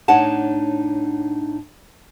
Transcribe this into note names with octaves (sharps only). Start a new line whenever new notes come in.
A2 D4 D#4 C#5 F#5 A5